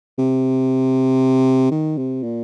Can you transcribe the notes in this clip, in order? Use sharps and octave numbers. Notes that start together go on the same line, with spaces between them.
C3
D#3
C3
A#2